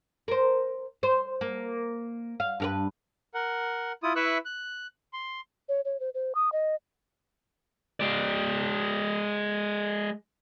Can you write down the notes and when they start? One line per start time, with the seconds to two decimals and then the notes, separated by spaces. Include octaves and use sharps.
0.28 A#4 C5
1.03 C5
1.41 A#3
2.40 F5
2.60 G2 A#4 B4
3.34 A#4 F#5
4.03 E4 F4 D#6
4.16 E4 B4 E5 C#6 E6 F#6
4.45 F#6
5.13 C6
5.69 C#5
5.85 C#5
6.00 C5
6.14 C5
6.35 D#6
6.52 D#5
8.00 G#3 D5